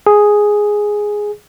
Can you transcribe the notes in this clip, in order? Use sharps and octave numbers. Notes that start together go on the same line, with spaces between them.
G#4